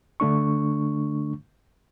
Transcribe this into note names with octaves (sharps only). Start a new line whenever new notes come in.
D3 A3 D4 C#6